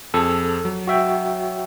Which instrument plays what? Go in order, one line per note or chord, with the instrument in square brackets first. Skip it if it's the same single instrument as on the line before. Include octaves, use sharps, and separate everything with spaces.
[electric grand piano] F2 G#4 [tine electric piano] A4
[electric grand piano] F#3
[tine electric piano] F#4 E5 G5